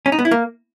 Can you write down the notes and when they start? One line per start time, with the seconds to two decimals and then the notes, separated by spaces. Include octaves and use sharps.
0.06 C#4
0.12 D#4
0.19 B3
0.25 E4
0.31 A#3